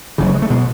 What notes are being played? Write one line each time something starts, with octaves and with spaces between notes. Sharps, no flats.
F#1 F#2 C#3 E3
F#3
G#3
A3
B2 G#3